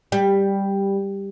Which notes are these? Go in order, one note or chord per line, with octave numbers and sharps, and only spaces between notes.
G3